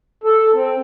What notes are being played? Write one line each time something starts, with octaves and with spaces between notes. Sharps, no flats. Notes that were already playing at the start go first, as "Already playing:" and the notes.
A4
C4